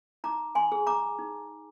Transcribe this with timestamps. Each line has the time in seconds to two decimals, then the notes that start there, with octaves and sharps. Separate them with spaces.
0.24 D#4 A#5 D6
0.55 G#5 C6
0.72 G#4
0.87 A#5 D6
1.19 D#4